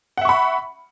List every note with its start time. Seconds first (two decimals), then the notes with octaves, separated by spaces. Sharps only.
0.17 F#5
0.21 E5
0.25 C#6
0.29 B5